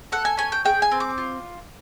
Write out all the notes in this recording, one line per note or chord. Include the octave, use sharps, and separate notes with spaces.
A4 F#5
G#5
C#4 G#5
G5
G#4 G5
G#5
C4
D6
F4